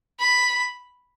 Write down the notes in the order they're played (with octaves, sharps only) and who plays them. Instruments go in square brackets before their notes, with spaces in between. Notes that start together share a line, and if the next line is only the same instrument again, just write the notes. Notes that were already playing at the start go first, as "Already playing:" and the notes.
[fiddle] B5